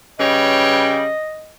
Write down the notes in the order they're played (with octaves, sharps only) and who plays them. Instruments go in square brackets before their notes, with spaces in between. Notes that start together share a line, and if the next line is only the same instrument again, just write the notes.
[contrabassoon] C#3 [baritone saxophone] G3 [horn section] B4 C#5 G5 [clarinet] D#5